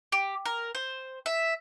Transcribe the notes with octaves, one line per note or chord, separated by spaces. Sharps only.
G4
A#4
C5
E5